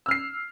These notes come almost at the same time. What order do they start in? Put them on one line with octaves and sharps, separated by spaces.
E6 F6 C7